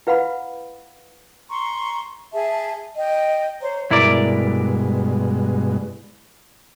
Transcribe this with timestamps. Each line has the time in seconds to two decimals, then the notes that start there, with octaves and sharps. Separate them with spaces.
0.07 E4 B4 F5 F#5 B5
1.49 A#5 C6 C#6
2.33 G#4 E5 A5
2.97 D#5 G5
3.61 C5 C#5 A#5
3.91 G2 B2 G#3 E4 A#4 D5